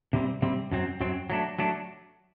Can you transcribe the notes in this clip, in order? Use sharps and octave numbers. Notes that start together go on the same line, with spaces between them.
C3 G3 C4
C3 G3 C4
F#2 F#3 C4
F#2 F#3 C4
F#3 A3 D4
F#3 A3 D4